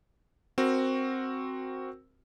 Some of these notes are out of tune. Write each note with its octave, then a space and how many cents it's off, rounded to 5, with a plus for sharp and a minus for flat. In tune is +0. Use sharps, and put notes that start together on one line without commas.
C4 +5 F#4 +0 A#4 +0